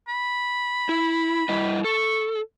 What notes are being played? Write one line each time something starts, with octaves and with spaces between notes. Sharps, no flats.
B5
E4
G3 E4 D#5
A4 C#6